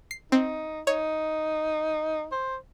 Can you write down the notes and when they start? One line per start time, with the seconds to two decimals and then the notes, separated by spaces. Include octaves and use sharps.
0.11 C7
0.32 C4 D#4
0.87 D#4 C#5
2.32 C5